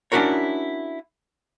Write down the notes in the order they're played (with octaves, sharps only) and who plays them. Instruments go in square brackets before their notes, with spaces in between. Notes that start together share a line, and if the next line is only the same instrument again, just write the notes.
[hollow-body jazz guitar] C#4 D4 E4 F#4 A#4 C#5